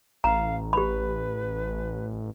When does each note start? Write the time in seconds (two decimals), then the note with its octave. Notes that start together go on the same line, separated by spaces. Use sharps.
0.24 A1 F5 A#5
0.73 G4 B4 B5